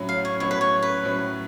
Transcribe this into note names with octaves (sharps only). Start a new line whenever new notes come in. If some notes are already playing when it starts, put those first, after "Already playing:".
Already playing: A2 F#3 C#4
F5
C#5
A2 F#3 C#4 C#5
B4
C#5
B4
A2 F#3 C#4